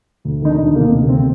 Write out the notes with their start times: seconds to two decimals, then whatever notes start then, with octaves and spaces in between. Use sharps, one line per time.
0.25 D2
0.42 D#3 D#4
0.50 D4
0.59 D2
0.75 C3 A#3
0.92 D2
1.09 D#3 C4